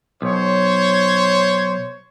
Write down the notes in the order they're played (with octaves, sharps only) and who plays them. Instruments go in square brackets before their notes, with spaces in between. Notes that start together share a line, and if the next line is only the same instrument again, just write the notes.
[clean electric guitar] B1 [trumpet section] C5 C#5